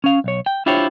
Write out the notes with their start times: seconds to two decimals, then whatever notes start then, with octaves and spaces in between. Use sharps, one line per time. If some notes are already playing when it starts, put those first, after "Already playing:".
0.04 C#4 F5
0.24 B1 C#5
0.46 G5
0.66 D4 E4 F4 G4 C5 C#5